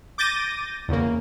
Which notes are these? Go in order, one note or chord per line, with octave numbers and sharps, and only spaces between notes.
D6 G6 A6 A#6 D#7
E2 C#3 A#3